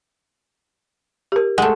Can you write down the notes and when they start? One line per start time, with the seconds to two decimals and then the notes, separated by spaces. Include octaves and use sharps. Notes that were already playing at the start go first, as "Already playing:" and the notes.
1.32 G4 A#4
1.58 G#3 A3 F#5